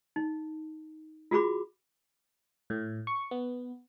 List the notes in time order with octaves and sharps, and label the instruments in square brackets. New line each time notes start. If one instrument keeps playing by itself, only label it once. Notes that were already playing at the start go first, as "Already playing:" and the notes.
[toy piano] D#4
F4 F#4 G#4 B5 D6
[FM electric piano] A2
C#6
B3